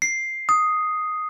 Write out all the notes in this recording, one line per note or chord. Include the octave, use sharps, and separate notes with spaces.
C7
D#6